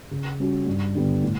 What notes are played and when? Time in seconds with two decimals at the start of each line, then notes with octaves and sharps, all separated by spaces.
0.11 C#3
0.40 G3 C#4 F#4
0.67 G2
0.95 D3 G3 B3
1.23 A2